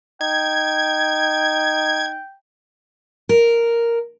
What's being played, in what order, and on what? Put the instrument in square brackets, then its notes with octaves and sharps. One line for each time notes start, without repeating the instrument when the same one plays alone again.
[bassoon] D#4 [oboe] G5 [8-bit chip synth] G#6
[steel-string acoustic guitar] A#4